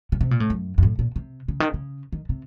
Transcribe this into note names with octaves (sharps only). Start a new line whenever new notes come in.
C#3
C3
A#2
A2
F#2
F#2
A2
A#2
C3
C#3
D#3
C#3
D#3
C3